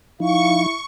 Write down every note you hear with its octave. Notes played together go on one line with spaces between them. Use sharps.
F3 D#4 E4 F5 C#6